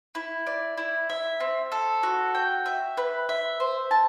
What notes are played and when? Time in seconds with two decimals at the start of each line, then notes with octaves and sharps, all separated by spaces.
0.15 E4
0.47 D5
0.77 E4
1.10 E5
1.40 C4
1.72 A4
2.03 F#4
2.35 G5
2.66 E5
2.97 B4
3.29 E5
3.60 C5
3.91 A5